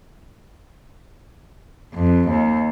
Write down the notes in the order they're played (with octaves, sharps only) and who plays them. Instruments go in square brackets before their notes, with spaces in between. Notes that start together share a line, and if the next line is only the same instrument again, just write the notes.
[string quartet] F2
D#2